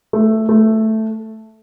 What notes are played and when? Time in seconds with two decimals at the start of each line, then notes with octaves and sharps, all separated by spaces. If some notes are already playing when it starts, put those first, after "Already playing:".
0.13 A3
0.49 A3